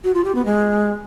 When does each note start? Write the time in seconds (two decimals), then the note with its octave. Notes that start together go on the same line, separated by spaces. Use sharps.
0.04 F#4
0.14 F4
0.25 G4
0.35 B3
0.45 G#3